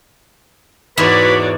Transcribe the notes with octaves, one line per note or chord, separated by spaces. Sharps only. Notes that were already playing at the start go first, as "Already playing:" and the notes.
E2 G#2 E3 F#4 B4 C#5 D5 B5